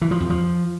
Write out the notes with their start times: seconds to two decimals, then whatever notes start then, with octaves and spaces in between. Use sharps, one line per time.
0.02 E3
0.11 F3
0.20 F2
0.30 F3